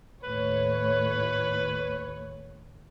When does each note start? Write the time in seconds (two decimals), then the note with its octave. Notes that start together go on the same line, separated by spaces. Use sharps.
0.24 D#2 A2 B4 C#5